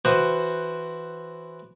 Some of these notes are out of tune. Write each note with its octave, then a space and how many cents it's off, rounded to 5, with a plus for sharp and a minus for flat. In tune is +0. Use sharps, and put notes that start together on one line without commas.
E3 +0 F#4 +0 C5 +0